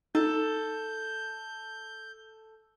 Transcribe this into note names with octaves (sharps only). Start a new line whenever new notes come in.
D#4 A4 G6